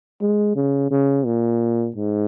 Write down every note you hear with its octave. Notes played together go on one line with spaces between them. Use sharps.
G#3
C#3
C#3
A#2
G#2